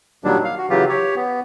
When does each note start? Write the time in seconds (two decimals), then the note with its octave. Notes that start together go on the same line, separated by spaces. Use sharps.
0.24 A#2 D#3 F#3 G3 D4
0.44 F5
0.58 F#4
0.70 C#3 E3 F#3 F4 G4
0.89 G4 C#5
1.16 B3